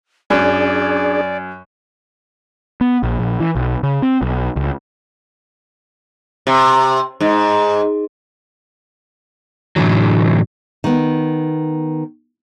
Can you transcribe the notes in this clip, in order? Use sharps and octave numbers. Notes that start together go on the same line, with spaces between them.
F#2 D4 G#4 D5
B3
A#1
A#1
E3
B1
C#3
C4
B1
C#2
C3
G#2
A2 D3 E3 F#3
D#3 B3